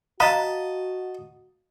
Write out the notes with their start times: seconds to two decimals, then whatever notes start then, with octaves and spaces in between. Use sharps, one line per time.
0.20 F#4 D#5 F5 A5 A#5